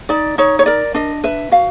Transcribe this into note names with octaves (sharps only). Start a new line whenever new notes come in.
D#4 D5
D#4 C#5
C#5
A#4 D5
D4 D#5
B4 E5
F#4 F5